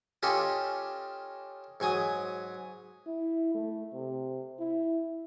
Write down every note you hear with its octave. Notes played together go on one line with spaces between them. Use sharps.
C#4 F4 G4 A4 D#5 A5
G#2 F#3 G#5 D#6
E4
A3
C3
E4